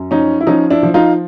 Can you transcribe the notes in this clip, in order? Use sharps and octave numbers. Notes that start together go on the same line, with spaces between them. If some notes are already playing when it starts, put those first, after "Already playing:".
Already playing: F#2
F3 C#4 D#4
E4
F3 C#4 D#4
D4 E4
F3
D#4 F4